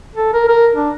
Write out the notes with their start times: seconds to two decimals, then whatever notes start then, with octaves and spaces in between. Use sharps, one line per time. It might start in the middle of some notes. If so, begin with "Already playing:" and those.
0.16 A4
0.33 A#4
0.48 A#4
0.75 D4